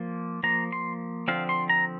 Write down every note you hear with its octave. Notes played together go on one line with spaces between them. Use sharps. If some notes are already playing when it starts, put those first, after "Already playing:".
Already playing: F3 A#3
F3 A#3 A#5
C6
D3 F3 C4 F5
C6
A#5